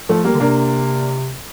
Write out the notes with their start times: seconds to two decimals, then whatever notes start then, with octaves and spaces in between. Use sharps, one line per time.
0.09 F3 A3
0.24 G3 A#3
0.34 D3
0.40 C3 A#3 D4